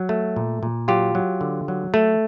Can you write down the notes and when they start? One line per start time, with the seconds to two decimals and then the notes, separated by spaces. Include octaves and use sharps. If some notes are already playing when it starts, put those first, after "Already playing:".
Already playing: F#3
0.09 A3
0.36 A#2
0.63 A#2
0.88 F#3 F4 G4
1.15 F#3
1.41 D3
1.68 F#3
1.94 A3